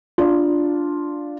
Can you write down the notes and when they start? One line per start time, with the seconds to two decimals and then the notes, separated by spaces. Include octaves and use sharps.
0.18 D4 F4